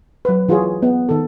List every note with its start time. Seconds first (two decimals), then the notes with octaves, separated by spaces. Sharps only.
0.25 F#3 B4
0.49 E3 F4 F#4 G#4 C#5
0.82 B3
1.09 D#3 A4